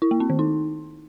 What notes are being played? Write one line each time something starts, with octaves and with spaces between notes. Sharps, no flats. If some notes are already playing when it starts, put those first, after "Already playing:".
E4
A#3
C4
D#3
D#4